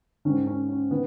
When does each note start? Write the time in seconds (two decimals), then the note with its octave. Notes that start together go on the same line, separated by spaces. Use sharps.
0.25 G#2 D#3 C#4
0.47 C#4
0.69 C#4
0.91 D#3 B3